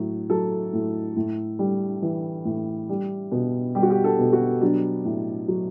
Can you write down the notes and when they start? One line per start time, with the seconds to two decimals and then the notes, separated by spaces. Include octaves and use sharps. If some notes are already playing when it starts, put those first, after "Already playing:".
Already playing: A2 F#3
0.30 F#3 A4
0.73 A2
1.16 A2
1.59 G3
2.02 E3
2.45 A2
2.89 G3
3.32 B2
3.75 G3 G4
3.83 F#4
3.90 G4
4.04 A4
4.19 B2
4.33 F#4
4.61 F#3 D4
5.05 A2
5.48 F#3